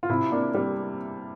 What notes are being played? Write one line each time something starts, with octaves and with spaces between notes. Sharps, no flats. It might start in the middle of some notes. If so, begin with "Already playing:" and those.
F4
C3 E4
A#3 D4
G3